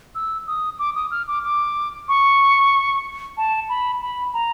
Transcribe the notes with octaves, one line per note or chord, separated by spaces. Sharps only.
E6
D#6
D6
D#6
F6
D6
D6
C#6
A5
B5
B5
A#5